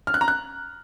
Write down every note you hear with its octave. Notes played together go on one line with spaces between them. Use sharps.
F6
F#6
A#5
F#6